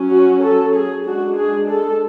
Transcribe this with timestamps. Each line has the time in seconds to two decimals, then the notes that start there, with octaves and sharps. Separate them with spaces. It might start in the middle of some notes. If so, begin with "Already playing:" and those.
Already playing: F#3 C#4
0.10 F#4
0.42 A4
0.74 G#4
1.04 G#3 D4 F#4
1.37 G#4
1.69 A4